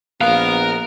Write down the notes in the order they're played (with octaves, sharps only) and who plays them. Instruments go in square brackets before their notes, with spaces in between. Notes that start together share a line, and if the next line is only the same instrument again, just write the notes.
[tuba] A#1 [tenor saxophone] B3 [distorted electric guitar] A#4 [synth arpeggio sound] F5